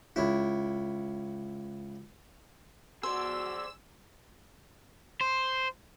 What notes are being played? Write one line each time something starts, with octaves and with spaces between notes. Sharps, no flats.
C#2 E4
F#4 G#4 C5 D5 E6
C5